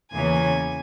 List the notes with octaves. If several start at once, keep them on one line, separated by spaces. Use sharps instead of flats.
E2 C#3 E3 A#3 C#4 G#5